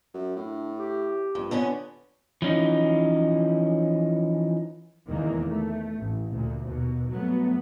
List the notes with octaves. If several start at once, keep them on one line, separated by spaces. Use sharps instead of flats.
F#2
A2 D4
G4
A#1 G2
F2 D3 B3 C#4
E3 F3 C#4 D#4
E2 C3 D#3 E3 G#3 A#3
A3
A1
D2 A#2
D#2 B2
G2 F#3 A3 B3